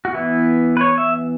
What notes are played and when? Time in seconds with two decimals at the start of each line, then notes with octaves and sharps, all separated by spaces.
0.05 F#4
0.14 E3 B3 E4
0.77 B4
0.81 C#5
0.98 E5